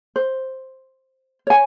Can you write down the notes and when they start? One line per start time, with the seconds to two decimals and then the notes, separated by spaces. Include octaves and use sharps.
0.16 C5
1.47 C#5 G#5